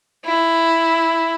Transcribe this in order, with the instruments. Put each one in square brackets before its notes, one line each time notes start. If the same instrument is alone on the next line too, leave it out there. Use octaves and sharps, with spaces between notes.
[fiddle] E4